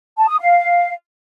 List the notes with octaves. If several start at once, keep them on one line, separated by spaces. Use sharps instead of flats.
A5
D#6
F5